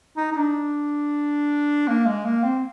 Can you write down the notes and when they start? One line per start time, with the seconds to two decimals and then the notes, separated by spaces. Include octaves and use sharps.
0.17 D#4
0.32 D#4
0.37 D4
1.88 A#3
2.06 G#3
2.25 A#3
2.43 C4